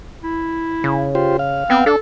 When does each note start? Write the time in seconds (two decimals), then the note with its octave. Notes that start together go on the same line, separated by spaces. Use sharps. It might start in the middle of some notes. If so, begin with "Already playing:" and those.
0.23 E4
0.84 C#3
1.15 F4 G4 C5
1.39 F5
1.70 B3 C4
1.86 D4 A4